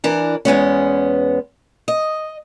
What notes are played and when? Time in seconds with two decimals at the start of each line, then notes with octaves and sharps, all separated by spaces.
0.04 E3 D4 A#4
0.45 E2 G#3 B3 C#4
1.88 D#5